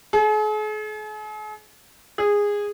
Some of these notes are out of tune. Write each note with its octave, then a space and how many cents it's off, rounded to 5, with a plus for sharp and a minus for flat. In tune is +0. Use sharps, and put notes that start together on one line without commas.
G#4 +45
G#4 -15